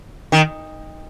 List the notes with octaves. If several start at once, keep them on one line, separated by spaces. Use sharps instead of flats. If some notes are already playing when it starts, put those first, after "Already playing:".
D#3